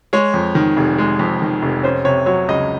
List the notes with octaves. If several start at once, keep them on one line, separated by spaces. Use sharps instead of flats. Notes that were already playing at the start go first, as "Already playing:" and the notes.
G#3 C#5
F2
D#3
F1
G#3
F2
D#3
F1
C#4 C5
C3 C#5
F#3 C#5
C#2 D#5